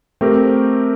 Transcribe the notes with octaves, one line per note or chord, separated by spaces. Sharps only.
A3 C4 G4 A#4